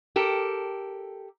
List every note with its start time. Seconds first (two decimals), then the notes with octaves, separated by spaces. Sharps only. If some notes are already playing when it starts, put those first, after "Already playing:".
0.16 G4 A4 A#4